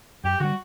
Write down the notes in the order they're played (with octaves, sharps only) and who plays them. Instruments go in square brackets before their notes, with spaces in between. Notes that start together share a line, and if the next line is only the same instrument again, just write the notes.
[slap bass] F#2 [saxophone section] G4
[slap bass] D3 G3 [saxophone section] F#4